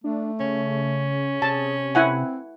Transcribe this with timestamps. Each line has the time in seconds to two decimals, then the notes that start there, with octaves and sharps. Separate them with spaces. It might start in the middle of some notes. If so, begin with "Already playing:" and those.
0.04 A3 D4
0.40 C#3 C#4
1.42 C3 G#4 A5
1.95 C4 E4 F#5 G#5